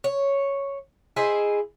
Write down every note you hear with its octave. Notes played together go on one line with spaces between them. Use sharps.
C#5
E4 G#4 C5 D#5